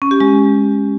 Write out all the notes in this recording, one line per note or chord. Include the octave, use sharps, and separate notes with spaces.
C#4
G4
G#3